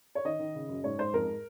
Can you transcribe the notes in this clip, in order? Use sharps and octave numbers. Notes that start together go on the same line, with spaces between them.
C#5
D#3 D#5
D#3
C#3
F#2
G#2 C#5
G#2 C5
F2 A#4